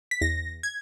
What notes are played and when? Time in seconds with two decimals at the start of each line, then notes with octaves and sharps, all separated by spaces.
0.11 B6
0.21 E2 A#6
0.63 G#6